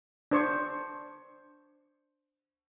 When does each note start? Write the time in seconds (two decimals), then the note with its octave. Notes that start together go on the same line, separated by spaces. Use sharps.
0.31 D4 C5 C#6